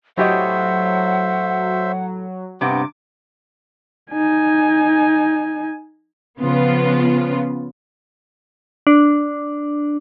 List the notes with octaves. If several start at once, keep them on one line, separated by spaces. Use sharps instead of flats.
A2 F#3 G4 C5 D#5 E5 F#5
G2 C3 B3 D6
D#4 G#5
C#3 F3 B3 F4
D4